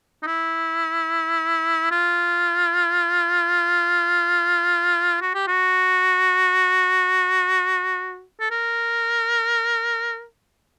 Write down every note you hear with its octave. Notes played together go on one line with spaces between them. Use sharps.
D#4
E4
F4
F#4
G4
F#4
A4
A#4